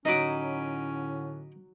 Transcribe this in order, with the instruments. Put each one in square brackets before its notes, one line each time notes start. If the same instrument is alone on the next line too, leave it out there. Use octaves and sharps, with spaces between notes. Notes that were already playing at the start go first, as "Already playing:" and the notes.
[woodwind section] A2 D3 [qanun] F#3 D#4 [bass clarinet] C#4 [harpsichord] D#5 B5 D6